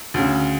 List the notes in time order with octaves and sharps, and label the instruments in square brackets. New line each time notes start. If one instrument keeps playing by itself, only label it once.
[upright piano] D2 C#3